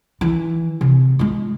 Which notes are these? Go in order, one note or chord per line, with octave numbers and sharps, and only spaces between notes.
E3
C3
G#3 F4